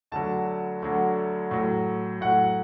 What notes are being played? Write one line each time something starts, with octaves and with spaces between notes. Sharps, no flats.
D2 D3 F#3 A5
D2 D3 F#3
A2 F#3
A2 F#3 F#5